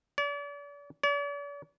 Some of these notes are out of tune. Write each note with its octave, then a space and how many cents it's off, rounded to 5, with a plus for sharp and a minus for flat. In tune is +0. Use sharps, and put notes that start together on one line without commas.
D5 -40
D5 -45